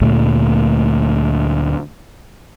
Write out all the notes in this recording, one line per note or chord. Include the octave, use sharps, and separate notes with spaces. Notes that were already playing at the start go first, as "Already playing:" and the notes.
D2 A#2 A3